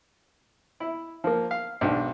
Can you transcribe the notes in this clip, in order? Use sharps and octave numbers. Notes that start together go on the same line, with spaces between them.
E4
F3 A#3
F5
B1 G#2 D4 G5